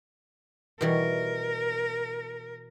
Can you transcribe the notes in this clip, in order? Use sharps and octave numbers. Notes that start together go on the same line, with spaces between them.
B2 E3 G3 A#4